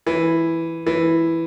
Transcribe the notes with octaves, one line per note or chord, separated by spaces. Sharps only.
E3
E3